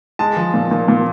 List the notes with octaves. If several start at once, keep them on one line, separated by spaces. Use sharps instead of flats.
G#3 A5
F3
A#2
A#2
A#2